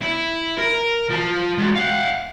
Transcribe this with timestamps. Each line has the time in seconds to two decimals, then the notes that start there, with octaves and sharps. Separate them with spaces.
0.01 E4
0.58 A#4
1.10 F3 A5
1.58 G#3 F#4
1.75 F5 F#5